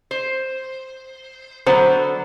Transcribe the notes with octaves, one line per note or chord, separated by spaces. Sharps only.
C5
D3 F#3 B3 C5